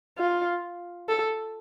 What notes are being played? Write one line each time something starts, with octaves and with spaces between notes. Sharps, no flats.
F4
A4